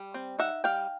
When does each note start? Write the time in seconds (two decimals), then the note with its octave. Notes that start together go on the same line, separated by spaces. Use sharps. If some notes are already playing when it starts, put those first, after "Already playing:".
Already playing: G3
0.14 C4
0.39 D#4 E5 F#5
0.64 G3 F5 G5